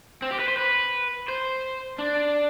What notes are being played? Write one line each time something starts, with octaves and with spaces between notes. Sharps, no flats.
C4
G4
B4
C5
B4
C5
D4